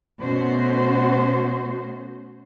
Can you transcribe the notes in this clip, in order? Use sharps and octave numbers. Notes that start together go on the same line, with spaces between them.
B2 A3 B3 C#4 F#4 C5